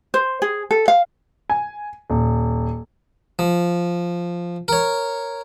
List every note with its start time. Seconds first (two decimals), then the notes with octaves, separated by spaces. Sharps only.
0.14 C5
0.42 G#4
0.71 A4
0.88 F5
1.50 G#5
2.10 D#1
3.39 F3
4.68 A#4 C#5